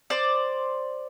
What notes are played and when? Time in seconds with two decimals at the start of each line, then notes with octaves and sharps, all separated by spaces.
0.10 C5 D5